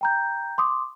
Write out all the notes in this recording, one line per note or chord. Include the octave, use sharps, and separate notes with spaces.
G5 A#5 G6
C6 D6 D#6